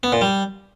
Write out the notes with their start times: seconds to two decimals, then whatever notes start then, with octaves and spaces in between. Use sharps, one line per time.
0.03 B3
0.12 A#2
0.21 G3